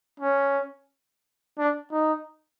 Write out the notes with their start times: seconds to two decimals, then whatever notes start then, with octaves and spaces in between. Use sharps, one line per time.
0.20 C#4
1.58 D4
1.92 D#4